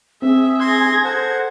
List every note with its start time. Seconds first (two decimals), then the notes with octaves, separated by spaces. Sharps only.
0.22 C4 G#4 E5
0.60 C6 G#6 A#6
1.04 A4 C5 F#5